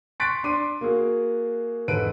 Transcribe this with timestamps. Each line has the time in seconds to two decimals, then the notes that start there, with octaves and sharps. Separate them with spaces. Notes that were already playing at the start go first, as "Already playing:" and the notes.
0.20 C6 C#6 F#6 A6 B6 D7
0.44 D4 C6 D6 D#7
0.81 A#3 F#4 G#4
1.88 E1 G#2 A4 B4 D7 D#7